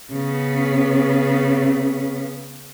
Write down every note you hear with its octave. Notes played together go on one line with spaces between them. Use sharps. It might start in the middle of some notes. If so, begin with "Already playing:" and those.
C#3 B3